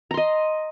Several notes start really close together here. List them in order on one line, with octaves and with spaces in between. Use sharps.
A#5 C6 D#5